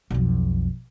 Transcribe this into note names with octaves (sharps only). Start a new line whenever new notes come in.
B1 F2